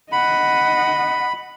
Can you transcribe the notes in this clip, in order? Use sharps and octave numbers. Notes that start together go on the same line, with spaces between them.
D#5 F#5 B5